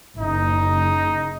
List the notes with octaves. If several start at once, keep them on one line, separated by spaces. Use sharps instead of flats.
F#1 C#3 D#4